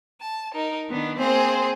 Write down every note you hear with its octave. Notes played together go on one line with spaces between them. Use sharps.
A5
D#4 A#4
D#3 B3 D4
A#3 C4 G#4 C5